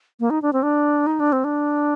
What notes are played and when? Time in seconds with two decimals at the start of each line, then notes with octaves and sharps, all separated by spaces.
0.20 A#3
0.30 D#4
0.42 D4
0.53 C4
0.63 D4
1.07 D#4
1.20 D4
1.32 C4
1.44 D4